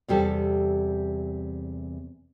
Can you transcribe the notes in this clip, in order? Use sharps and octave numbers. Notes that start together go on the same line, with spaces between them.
E2 C3 G3 A4